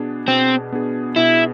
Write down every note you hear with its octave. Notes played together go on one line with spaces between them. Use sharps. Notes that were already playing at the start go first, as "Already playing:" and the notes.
Already playing: B2 B3 D4 G#4
B2 C4
B3 D4 G#4
B2 E4